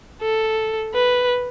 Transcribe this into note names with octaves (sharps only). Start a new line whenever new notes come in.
A4
B4